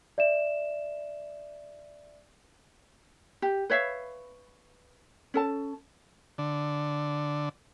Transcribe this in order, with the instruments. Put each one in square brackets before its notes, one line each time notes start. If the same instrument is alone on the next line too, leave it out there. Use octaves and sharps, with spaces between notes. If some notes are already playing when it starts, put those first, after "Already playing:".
[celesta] D5 E5 E7
[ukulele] G4
B4 C#5 E5 F5
C#4 A4 A5
[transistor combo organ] D3